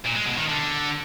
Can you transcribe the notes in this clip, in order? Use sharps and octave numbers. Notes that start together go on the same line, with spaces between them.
A#2
G#3
B2
D#3
D3